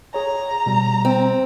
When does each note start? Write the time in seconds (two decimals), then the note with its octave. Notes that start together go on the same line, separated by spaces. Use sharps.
0.14 G#4 C#5 A#5
0.66 B2 G3
1.05 C4